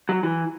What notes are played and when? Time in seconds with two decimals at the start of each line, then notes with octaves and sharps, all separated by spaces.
0.09 F#3
0.23 E3